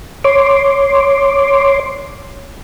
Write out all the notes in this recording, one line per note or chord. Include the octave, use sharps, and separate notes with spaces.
C#5 C6 D6